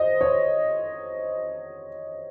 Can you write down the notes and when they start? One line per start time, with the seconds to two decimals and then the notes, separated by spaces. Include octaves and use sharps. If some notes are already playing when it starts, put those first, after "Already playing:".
Already playing: C5 D#5
0.21 C#5